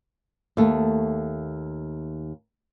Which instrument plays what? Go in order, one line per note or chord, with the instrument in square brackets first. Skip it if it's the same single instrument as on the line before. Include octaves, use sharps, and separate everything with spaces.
[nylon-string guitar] D#2 A3